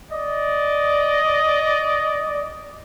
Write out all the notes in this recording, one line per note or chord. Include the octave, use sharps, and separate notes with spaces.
D5 D#5